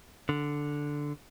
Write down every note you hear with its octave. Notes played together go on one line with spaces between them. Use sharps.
D3